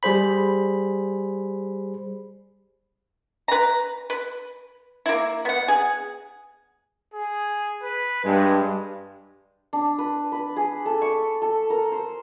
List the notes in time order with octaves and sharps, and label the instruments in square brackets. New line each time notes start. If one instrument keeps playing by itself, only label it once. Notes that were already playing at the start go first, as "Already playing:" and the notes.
[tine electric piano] G3 G#4 C5 B5
[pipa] B4 A#5
B4
A#3 E4
B3 F#5
G#4
[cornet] G#4
B4
[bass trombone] G2 [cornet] G#3
[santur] D4
B4
B4
G#4
A4
C#6
A4
A#4
C5